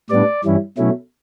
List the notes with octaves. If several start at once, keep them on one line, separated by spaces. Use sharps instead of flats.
A2 G3 B3 D4 D5
G2 E3 G3 C#4 E4
B2 F#3 A3 C#4 E4